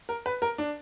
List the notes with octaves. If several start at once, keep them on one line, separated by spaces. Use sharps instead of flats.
A#4
B4
A#4
D4